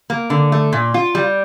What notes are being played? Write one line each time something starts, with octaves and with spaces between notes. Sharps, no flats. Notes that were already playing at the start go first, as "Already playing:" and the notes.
A#3
D3
A3
A#2
F4
G3